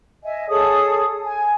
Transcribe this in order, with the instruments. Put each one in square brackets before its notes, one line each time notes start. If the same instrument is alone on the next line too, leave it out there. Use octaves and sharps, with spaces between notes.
[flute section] D#5 E5 G#5
G#4 A4 C#5 D#6
G#5